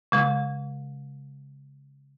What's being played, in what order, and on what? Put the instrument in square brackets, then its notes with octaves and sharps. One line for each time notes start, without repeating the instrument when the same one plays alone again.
[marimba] C#3 G#3